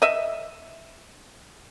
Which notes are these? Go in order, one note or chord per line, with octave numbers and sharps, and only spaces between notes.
D#5 E5